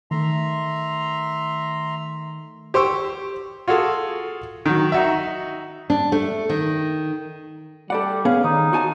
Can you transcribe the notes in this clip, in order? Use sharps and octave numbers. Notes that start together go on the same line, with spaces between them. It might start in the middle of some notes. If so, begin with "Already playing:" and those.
D#3 A3 E5 A#5 C6
G4 C5 C6 C#6 E6
F4 F#4 G#4 A4
D#3 F#3
D#4 F#4 E5
D4
A3
D#3
G3 A4 D5 F#5
B3 C#4 G#4 F5
D#3 D#4
F#4 G#5 A5